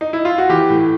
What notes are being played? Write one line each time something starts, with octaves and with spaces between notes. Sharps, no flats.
D#4
E4
F4
F#4
E3 G4
A2